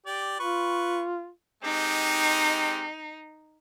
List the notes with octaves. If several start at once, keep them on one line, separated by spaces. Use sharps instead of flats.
G4 D5
F4 B4 C#6
G#3 C4 D#4 G4